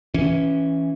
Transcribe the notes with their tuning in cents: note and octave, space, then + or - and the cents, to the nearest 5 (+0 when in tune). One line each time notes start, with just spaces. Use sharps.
E3 +0 C#4 +0